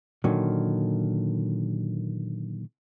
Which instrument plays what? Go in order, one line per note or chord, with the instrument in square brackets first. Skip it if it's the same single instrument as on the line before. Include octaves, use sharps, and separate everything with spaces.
[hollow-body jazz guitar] A#2 D3 D#3 F#3